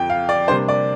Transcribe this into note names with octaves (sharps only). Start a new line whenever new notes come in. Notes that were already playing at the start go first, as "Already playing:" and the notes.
Already playing: F2 F3 G5
F5
D5
C3 G3 A#3 D4 C5
D5